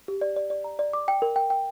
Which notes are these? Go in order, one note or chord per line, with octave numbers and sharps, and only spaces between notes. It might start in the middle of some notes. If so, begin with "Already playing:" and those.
G4
D5
D5
D5
A#5
D5
D6
G5
A#4
G5
G5